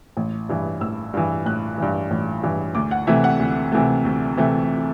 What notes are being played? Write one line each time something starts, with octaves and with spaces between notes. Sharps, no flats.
A1
G2 E3
A1 E6
G2 E3
A1 F#6
G2 E3
A1
G2 E3
D2 D6
F#5
C3 E3 A3 E5
F#5
D2
C3 E3 A3
D2
C3 E3 A3